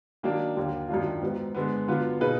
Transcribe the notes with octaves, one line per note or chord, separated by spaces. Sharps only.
D#3 F#3 A#3 D4
D#2 D3 F#3 A#3
F#2 D#3 F#3 D4 F4
G#2 F#3 B3
D3 G#3 B3
D3 F#3 B3 F4 B4
B2 A#3 D#4 G#4 B4